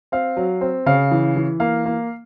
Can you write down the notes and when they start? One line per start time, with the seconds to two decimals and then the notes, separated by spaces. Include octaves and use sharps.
0.12 C4 F5
0.37 F#3
0.61 C4
0.86 C#3 F5
1.11 E3
1.36 E3
1.60 A#3 F5
1.86 A#3